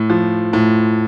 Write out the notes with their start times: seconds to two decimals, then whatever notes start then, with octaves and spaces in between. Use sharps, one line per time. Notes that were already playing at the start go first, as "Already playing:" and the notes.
Already playing: A2
0.10 F3
0.53 A2